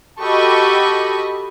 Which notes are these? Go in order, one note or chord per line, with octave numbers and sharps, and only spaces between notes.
F#4 G4 A4 D#5 B5 C#6